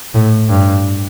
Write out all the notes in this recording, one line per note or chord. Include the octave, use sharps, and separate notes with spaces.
A2
G2